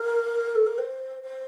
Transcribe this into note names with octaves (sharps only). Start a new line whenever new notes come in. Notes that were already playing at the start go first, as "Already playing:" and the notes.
Already playing: A#4
A4
A#4
C5
C5